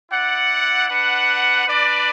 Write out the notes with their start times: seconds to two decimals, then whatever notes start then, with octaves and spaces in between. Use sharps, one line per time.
0.10 E4 D5 F#5
0.88 D4 B4 F#5
1.67 D4 B4 D5